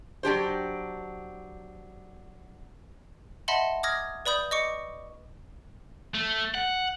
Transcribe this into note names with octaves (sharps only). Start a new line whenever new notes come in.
F#3 D4 G4 C5
D#5 E5 F#5 A5 B5 C6
D6 D#6 F6 G#6 A#6
B4 D5 B5 D#6 G6
D#5 C#6 D6 C#7
A3
F#5